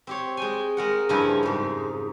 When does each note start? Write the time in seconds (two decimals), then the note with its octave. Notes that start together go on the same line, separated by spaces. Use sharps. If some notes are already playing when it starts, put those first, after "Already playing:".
0.07 C4 G4 C#5
0.37 G#3 G5 G#5
0.77 G#3 A#4 F#5
1.09 G2 C#3 F3 E4 G#5
1.43 F2 G#2